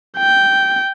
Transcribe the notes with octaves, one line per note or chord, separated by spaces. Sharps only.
G5